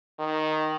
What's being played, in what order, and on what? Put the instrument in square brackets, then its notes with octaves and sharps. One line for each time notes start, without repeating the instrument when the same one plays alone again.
[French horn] D#3